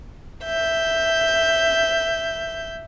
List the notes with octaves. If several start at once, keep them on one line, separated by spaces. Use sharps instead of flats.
E5 G6